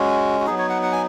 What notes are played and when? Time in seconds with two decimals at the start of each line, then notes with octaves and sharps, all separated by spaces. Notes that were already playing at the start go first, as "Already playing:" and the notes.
Already playing: G#3 C#4 F#4
0.40 F#4
0.47 F#3 B3 D#4 G#4
0.58 C#5
0.70 F#5
0.83 F#5
0.92 G#5